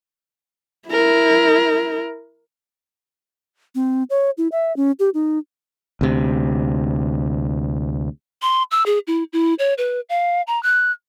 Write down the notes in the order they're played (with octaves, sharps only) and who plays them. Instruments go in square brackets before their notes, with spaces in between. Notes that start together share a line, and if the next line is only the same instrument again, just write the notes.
[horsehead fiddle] E4 A#4
[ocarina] C4
C#5
E4
E5
C#4
G4
D#4
[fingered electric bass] D2 C3
[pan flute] C6
E6
G#4
E4
E4
C#5
B4
F5
A#5
F#6